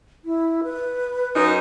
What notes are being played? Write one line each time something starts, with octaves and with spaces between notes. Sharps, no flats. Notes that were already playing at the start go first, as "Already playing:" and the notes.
E4
B4
F#2 D#4